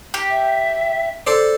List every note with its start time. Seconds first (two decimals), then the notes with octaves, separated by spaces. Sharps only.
0.14 G4
0.30 E5
1.27 A4 C5 D5